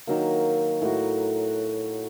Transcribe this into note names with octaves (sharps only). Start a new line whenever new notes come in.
D#3 F#3 A#3
A2 F#4